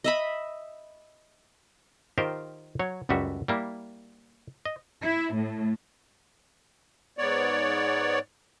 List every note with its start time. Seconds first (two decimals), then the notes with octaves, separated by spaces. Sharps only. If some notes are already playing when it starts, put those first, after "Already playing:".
0.04 D#5 E5 B5
2.18 D#3 F4 G4 A#4 C5
2.79 F#3 C#5
3.09 C#2 F#2 G3 F#4 E5
3.48 G3 A#3 E4
4.65 D#5
5.02 E4
5.34 A2
7.18 G#2 B3 C#5 D5